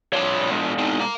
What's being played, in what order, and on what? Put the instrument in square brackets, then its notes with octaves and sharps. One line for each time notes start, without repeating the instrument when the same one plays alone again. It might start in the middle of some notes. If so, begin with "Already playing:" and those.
[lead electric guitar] C2 C#5 [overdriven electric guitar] F3 D4
[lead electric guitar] B2 G#3
[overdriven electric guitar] C4 D#4
F5 A#5